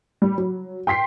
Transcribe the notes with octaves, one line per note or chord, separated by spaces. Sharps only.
G3
F#3
G5 C6 B6 C7